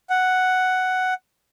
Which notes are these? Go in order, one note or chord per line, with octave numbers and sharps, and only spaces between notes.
F#5